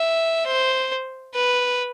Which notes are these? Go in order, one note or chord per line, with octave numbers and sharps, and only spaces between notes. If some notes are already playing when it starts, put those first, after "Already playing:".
Already playing: E5
C5
B4